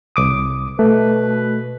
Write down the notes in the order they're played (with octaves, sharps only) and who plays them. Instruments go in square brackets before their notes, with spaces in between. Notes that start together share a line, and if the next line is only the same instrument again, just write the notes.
[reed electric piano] C2 D6 D#6
[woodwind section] B2 B4 [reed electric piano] A3